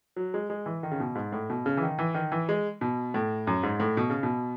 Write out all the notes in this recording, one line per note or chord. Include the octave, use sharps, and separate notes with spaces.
F#3
G#3
G#3
E3
D#3
C#3
B2
G#2
A2
B2
C#3
E3
D#3
E3
D#3
E3
G#3
B2
A2
F#2
G#2
A2
B2
C#3
B2